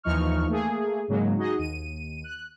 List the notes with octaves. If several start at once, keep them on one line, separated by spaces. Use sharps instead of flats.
D#2 E3 F3 D#4 C#6 F6
A3 A#3 G#4
G#2 C#3 F#3 G#3 A#3
D#4 F#4 G#4 D#5
D#2 D#7
F#6